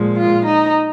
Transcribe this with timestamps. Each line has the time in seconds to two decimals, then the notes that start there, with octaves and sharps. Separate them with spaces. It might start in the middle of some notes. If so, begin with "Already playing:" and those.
Already playing: A#2 F3 G#3
0.16 F4
0.45 D#4